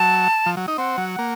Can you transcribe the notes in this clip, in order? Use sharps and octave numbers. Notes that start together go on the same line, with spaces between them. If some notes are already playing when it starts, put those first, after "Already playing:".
Already playing: F#3 A5
F3
F#3
D#4
C4 F#5
F#3
A#3